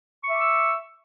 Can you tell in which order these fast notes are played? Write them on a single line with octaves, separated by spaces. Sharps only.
C#6 E5 D6 E6